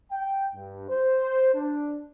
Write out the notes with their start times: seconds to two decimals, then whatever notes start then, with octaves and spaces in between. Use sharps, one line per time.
0.12 G5
0.55 G2
0.89 C5
1.55 D4